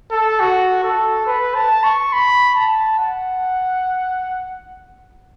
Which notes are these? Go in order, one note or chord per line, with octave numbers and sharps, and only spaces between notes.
A4
F#4
A4
B4
A5
C#6
B5
A5
F#5